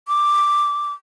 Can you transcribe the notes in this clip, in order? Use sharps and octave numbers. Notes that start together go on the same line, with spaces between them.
D6